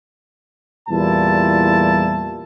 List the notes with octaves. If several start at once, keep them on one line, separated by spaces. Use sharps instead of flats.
E2 A#2 G3 E4 A5